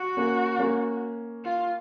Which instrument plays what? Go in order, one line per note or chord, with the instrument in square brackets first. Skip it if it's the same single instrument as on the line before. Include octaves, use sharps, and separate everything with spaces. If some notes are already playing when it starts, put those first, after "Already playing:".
Already playing: [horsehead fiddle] F#4
[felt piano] A#3 C#4
A#3 C#4
[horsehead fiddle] F4